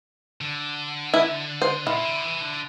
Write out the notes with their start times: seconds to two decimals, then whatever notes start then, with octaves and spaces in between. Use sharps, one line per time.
0.41 D3
1.14 E4
1.62 C5
1.86 A#2 E4
2.04 D3
2.23 E3
2.41 D3